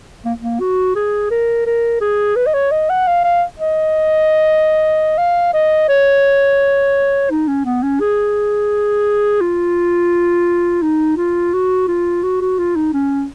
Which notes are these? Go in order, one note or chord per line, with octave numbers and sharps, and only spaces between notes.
A#3
A#3
F#4
G#4
A#4
A#4
G#4
B4
D#5
C#5
D#5
F#5
F5
F5
D#5
F5
D#5
C#5
D#4
C#4
B3
C#4
G#4
F4
D#4
F4
F#4
F4
F#4
F#4
F4
D#4
C#4